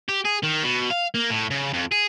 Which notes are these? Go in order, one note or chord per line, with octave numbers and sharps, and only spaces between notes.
G4
G#4
D#3
B2
F5
A#3
A2
C#3
F2
G#4